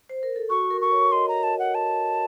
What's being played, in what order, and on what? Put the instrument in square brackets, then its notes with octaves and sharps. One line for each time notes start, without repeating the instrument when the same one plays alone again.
[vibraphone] C5
A#4
A4
[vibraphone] F#4 [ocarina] C#6
[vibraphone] A#4
[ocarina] C#6
[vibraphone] C#5
[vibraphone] D#5 [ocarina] C6
[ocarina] A#5
A5
F#5
A5